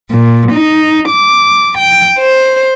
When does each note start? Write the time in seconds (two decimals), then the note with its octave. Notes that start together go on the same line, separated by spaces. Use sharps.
0.12 A#2
0.52 D#4
1.09 D6
1.78 G5
2.19 C5